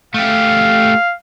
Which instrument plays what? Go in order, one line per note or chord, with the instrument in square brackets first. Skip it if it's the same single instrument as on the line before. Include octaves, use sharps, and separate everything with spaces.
[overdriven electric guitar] A3 G4 [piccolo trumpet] F5